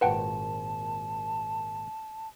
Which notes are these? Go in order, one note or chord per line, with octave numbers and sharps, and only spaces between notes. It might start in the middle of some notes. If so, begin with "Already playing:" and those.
G#1 A#2 F#4 B4 F#5 G5 A5